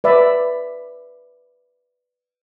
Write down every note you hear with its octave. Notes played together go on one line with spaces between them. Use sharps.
B4 D5 E5